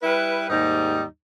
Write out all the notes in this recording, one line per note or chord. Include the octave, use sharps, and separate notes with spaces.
G3 E4 B4
D#2 G#2 G3 D#4